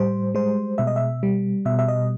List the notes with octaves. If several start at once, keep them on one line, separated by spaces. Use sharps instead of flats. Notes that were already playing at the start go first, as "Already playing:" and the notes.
Already playing: A2 G3 C5
G#3 C5
B2 E5
D#5
E5
G3
B2 E5
E5
D#5